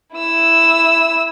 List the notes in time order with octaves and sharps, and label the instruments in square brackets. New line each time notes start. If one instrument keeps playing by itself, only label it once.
[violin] E4 E6